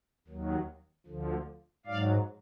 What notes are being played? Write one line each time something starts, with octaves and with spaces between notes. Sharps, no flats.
D#2 D#3 F#3
D2 D3 F3
G#2 F#3 D5 F5